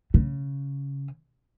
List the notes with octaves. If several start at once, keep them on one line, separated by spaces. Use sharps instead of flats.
C#3